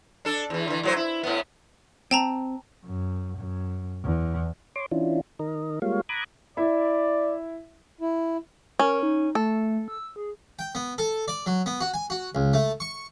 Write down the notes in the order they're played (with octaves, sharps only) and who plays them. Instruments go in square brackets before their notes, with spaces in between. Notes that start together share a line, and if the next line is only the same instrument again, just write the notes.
[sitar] D4 A4
E2 E3
D3 E3
A2 F#3 C5
E4
A2 B3
[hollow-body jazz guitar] C4 [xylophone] G5 A5 A#5
[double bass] F#2
F#2
E2
[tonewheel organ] C#5 C6 D6
E3 C#4 D4 E4 F4
D#3 A#4 D#5
G3 G#3 A#3 F4 C#5 F5
A#5 B5 D6 D#6 F#6 G#6
[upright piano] E4 E5 [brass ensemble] D5
[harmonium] E4
[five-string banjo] C#4 [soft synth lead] A#4
[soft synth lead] D#4
[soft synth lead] A3 [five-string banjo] A4
[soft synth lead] E6
G#4
[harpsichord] G5
B3
A4
D5
F#3
B3
F#4
G#5
F#4
C#2
A3
C#6